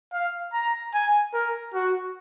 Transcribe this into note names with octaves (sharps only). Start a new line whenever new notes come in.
F5
A#5
G#5
A#4
F#4